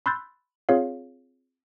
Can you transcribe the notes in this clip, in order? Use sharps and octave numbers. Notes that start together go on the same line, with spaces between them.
B5 C6 E6 F#6 G6 A6
C4 F4 G#4 C#5 F5